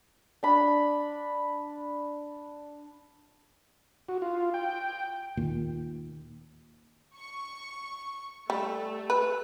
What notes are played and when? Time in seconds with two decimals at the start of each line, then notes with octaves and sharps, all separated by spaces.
0.43 D4 B5
4.09 F#4
4.22 F4
4.54 G5
5.37 D#2 A#2
7.17 C#6
8.50 G3 A3
9.10 B4